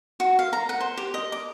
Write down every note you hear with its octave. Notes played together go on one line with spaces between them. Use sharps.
F#4
F5
A#5
F#5
C5
G4
D#5
D6